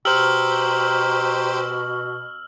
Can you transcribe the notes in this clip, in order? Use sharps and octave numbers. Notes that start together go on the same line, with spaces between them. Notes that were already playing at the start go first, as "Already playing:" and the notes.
B2 G4 C5 A#5 E6 F6 F#7